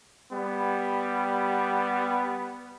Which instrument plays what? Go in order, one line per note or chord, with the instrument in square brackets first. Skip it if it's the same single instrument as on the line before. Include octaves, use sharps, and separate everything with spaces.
[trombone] G3 [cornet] B3